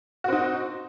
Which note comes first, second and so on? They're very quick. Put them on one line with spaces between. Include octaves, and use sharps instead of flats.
F#4 C4 D#4